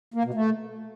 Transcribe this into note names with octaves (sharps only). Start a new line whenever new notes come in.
A#3
B2
A3